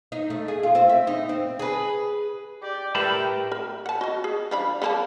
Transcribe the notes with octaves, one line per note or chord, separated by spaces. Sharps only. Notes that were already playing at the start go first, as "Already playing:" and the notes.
D#4
A3
G#4
F4
C4
E5
D#4
C4
G#4 B4
G4 D5
A2 G3 A#4 B4 E5 G5 A5 B5
A#4
F#5 A5
F#4 D#5
G#4
F3 D4 B5
C#3 A#3 A5